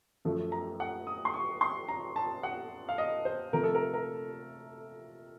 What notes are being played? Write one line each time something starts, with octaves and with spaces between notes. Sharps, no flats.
F#2 F3 A3
A#5
F#5
D#6
C6
C#6
C6
A#5
A5
F#5
F5
D#5
C5
C3 F3 A3 A#4
A4
A#4
A#4